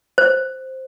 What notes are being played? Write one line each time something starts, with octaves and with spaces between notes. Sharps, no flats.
C5